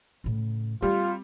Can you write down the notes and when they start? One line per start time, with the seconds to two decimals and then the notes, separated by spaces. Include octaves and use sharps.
0.24 A2 C#3
0.82 G3 C4 F4